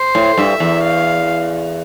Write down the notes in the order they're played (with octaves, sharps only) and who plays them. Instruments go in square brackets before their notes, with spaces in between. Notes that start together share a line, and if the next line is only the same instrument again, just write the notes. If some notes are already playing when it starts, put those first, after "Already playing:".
Already playing: [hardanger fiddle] C5
[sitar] A2
[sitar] G2 [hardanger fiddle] E5
[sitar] E2
[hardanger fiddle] F5